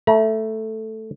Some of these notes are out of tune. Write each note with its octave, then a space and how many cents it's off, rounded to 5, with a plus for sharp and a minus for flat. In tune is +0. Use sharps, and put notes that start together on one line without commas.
A3 +0 A#5 +45